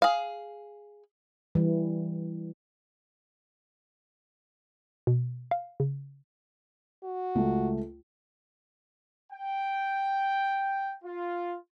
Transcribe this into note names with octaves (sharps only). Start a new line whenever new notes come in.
G#4 F5
E3 G3
B2
F5
C#3
F#4
C#2 A3
G5
F4